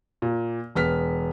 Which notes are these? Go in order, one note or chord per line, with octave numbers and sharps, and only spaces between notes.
A#2
E1 B3 F6 B6